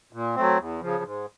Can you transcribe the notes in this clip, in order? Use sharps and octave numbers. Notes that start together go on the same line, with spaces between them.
A#2
F#3 A3 C4
E2
C#3 F3
G#2